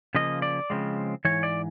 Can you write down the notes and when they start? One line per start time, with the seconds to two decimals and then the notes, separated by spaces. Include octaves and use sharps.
0.15 C#3 F3 A#3 D#5
0.42 D5
0.70 C#3 F3 G#3 C4
1.25 G#2 E3 C#5
1.43 D5